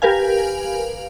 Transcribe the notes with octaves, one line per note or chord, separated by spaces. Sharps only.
G4 A#4 B4 F5 G#5